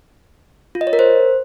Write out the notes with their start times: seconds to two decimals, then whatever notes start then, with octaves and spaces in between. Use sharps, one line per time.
0.75 F4
0.81 D#5
0.87 C#5
0.93 A#4
0.99 C5